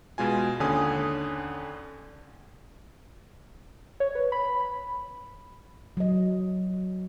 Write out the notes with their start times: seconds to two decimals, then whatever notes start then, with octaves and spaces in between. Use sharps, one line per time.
0.18 B2 G#3 F4 G#5
0.60 D#2 D3 C#4 G#5 D#6
4.00 C#5
4.15 B4
4.32 B5
5.97 F#3 D#5